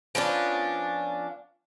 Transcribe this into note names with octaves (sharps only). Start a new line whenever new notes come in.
F3 B3 C#4 D4